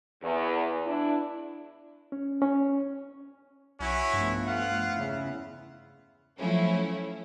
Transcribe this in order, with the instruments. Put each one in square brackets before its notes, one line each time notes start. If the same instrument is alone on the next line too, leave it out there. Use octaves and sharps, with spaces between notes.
[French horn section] E2
D4 E4
[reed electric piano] C#4
C#4
[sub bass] B1 [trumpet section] C#4 E4 F#4
[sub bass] G2 [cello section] F3 A3 B3
[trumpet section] F4 F5 F#5
[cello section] E2 C#3 E4
[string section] F3 F#3 A3 C#4 E4